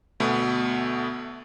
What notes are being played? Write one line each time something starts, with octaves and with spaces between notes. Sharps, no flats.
D2 B2 A3